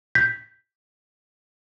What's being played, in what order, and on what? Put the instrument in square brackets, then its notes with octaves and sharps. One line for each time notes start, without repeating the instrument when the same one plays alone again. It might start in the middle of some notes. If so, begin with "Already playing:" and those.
[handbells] G6 B6